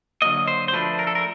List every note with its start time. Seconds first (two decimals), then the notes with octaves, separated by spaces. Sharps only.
0.22 D3 F#3 A#3 D#5
0.48 C5
0.68 C5
0.73 F3 A3 D4 B4
0.99 A#4
1.07 A4
1.15 A#4